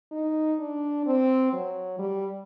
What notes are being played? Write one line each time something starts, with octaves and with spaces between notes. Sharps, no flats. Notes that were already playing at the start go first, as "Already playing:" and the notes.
D#4
D4
C4
F#3
G3